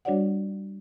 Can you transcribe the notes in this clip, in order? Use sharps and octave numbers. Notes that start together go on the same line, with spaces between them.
G3 D4 F#4 C#5 D5 F#5